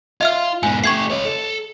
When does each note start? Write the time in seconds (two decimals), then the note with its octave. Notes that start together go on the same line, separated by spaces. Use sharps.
0.21 F4 D#5 E5 F6
0.63 G#2 B2 G#5
0.84 A3 G4 C#6 G#6 C7
1.10 C#5 D#5
1.25 A4